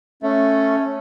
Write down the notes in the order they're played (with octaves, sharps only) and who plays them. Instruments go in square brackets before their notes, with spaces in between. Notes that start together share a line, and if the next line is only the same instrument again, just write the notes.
[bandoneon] A3 [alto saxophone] C#4